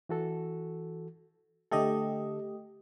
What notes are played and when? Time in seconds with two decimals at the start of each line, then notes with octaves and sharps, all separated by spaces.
0.09 E3 F#4 A4
1.72 D3 A3 G4 A4 D#5